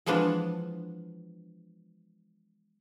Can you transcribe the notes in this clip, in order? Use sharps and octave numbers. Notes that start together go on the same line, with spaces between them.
E3 F3 G#3 B3 D4